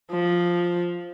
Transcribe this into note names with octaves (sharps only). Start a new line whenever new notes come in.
F3